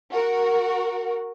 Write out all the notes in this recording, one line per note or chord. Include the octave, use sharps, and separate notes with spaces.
F#4 A#4